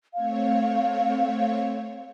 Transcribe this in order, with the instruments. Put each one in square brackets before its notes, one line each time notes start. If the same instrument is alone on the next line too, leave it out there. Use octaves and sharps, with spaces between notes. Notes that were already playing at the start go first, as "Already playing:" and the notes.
[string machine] A3 C4 C#5 [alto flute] F5